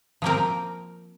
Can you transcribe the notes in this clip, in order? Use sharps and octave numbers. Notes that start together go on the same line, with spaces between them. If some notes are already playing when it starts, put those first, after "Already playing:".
F3 A#3 C4 A#4